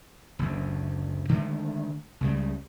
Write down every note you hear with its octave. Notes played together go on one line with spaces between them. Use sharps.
F#1 D2
D3 D#3 G#3 A3
C#2 C#3 G3